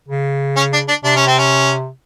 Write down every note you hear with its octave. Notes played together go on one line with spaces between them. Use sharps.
C#3
C#4
D4
D4
C3 D4
C#4
C4
C#4